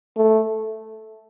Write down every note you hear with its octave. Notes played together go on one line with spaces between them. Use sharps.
A3